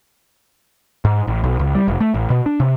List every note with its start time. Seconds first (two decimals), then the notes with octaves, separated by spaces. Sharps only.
1.05 G#2
1.27 A1
1.44 B1
1.59 C#2
1.75 G3
1.88 F1
2.00 A3
2.14 A1
2.30 B2
2.46 D4
2.60 C3